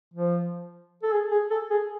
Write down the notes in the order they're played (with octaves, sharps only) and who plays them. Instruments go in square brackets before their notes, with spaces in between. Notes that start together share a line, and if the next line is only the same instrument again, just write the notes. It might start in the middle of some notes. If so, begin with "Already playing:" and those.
[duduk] F3
A4
G#4
G#4
A4
G#4